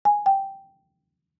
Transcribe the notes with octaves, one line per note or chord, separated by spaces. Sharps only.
G#5
G5